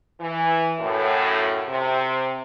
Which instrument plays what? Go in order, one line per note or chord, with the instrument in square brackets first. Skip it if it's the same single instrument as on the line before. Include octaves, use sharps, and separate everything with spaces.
[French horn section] E3
F#2 A2
C3